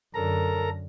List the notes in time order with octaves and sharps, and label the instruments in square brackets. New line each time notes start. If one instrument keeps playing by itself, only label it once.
[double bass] F#2 D3 [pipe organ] A4 A#4 A#5